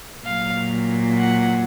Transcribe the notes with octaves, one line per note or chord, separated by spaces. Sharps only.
A#2 F#3 F5
F#5